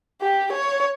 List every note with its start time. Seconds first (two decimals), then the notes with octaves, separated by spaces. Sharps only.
0.21 G4
0.52 C#5